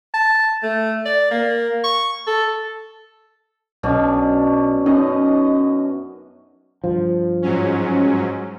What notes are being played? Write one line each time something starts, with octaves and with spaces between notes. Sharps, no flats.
A5
A3
D5
A#3
C#6
A4
B1 B2 C#4 D4
F#2 C#4 D#4 D#5
G2 F3
G#2 F#3 C#4